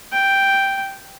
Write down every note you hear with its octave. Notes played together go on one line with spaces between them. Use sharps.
G5